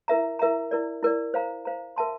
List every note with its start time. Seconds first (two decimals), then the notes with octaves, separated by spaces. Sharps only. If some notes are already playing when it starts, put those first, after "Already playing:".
0.08 E4 A#4 E5 A#5
0.39 E4 A#4 E5 A#5
0.71 E4 A#4 D5
1.03 E4 A#4 D5
1.34 C5 F5 A#5
1.65 C5 F5 A#5
1.96 A#4 E5 A5 C6